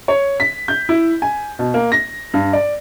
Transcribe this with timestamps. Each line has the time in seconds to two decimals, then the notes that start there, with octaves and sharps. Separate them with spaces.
0.08 C#5
0.40 B6
0.68 G6
0.89 E4
1.22 G#5
1.59 B2
1.74 A#3
1.92 A#6
2.34 G2
2.53 D5